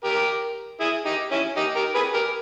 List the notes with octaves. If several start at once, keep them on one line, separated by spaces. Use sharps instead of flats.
G4 A#4
E4 G#4
D#4 G4
C#4 E4
D#4 G4
G4 A#4
G#4 B4
G4 A#4